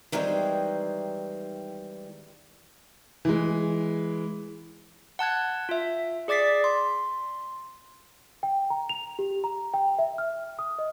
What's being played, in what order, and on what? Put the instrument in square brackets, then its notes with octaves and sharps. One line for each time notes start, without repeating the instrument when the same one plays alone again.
[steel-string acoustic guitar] D#3 E3 G3 G#3 C4
[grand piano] E3 G#3
[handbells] F#5 A5 F#6 G#6
F4 E5
G#4 D5 D6 A6 B6 C7
C6
[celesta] G5
A#5
F7
G4
A#5
G5
E5
F6
D#6
D#5